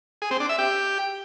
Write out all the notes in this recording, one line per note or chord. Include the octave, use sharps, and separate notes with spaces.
G#4
C4
D4
E5
G4